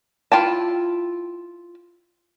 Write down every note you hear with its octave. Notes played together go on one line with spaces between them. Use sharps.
E4 F4 G5 A5